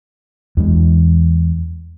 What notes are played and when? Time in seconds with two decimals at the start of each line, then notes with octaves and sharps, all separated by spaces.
0.57 E2 E3 G#3